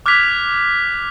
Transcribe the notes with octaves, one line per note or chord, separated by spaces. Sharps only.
D6 F6 F#6 G#6 B6 F7